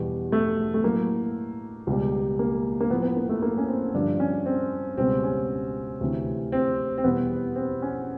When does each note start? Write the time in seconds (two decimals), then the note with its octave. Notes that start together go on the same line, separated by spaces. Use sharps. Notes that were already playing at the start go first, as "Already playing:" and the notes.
Already playing: E2 B2 G3
0.32 A3
0.74 A3
0.84 A2 F#3 A#3
1.87 C#2 B2 G3
2.39 A#3
2.81 A#3
2.90 A2 F3 B3
3.03 B3
3.16 A#3
3.29 A3
3.42 A#3
3.57 C#4
3.68 C4
3.94 G2 D3 F3 D4
4.20 C#4
4.46 C4
4.97 C#2 B2 G3 C4
5.23 C#4
6.00 D2 C3 E3
6.52 C4
6.98 C4
7.04 E2 B2 G3 B3
7.56 C4
7.82 C#4